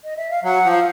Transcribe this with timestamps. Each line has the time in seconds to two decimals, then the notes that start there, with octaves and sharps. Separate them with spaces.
0.04 D#5
0.17 E5
0.30 F5
0.44 F#3 F#5
0.65 F3
0.71 F5